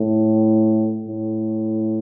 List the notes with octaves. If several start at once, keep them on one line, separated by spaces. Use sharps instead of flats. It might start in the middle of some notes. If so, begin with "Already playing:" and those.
Already playing: A2
A2